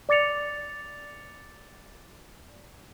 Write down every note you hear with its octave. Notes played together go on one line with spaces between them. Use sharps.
D5 D6 A6 C#7 F7